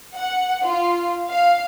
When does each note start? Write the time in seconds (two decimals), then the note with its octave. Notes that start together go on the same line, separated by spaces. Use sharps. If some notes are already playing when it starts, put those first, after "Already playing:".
0.15 F#5
0.64 F4
1.28 F5